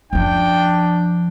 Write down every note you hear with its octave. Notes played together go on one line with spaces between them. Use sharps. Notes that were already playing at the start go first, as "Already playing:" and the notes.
F#2 F3 D4 G5